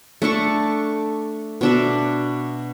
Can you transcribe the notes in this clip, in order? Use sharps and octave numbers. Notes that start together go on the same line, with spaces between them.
A3 D4 A4 C#6
B2 D4 E5